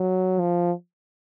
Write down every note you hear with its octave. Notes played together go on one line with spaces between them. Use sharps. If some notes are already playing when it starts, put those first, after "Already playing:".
Already playing: F#3
F3